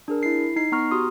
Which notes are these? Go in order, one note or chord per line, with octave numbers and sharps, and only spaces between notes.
D4 G#4 A#4
E4 C7
D#4 C7
B3 A#5 C#6 F6
F#4 G4 C6 D#6